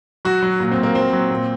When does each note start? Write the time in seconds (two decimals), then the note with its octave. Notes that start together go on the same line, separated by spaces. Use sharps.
0.25 F#3 F#4
0.42 F#3
0.60 A#2
0.72 C4
0.78 A#2
0.83 A#3
0.95 F#3 C4
1.13 F#3
1.30 A#2